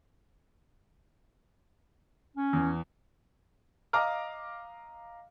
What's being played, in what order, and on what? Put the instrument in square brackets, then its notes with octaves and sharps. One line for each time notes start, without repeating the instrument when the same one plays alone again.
[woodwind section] C#4
[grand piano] E2
D#5 F5 A#5 D6 F6